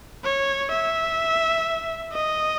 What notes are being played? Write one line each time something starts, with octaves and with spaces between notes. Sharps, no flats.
C#5
E5
D#5